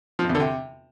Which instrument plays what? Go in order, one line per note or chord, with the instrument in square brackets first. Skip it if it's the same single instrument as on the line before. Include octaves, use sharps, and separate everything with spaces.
[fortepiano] F3
F2
E2
D3
C3